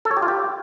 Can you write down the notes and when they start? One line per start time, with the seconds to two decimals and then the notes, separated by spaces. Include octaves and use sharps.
0.05 A4
0.11 C#5
0.17 G4
0.22 F4
0.28 G4